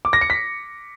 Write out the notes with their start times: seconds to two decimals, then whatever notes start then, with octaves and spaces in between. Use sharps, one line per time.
0.05 D6
0.13 A#6
0.21 C#7
0.30 B6